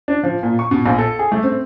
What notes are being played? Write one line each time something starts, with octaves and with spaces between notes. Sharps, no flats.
D4
F3
A#2
C#6
B2
A#1
A4
G#4
A3
C4